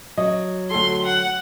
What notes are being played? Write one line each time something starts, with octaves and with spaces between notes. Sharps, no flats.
F#3 D#5
D2 A4 C6
F#5